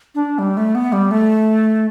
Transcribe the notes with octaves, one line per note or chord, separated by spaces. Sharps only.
D4
G3
A3
B3
G3
A3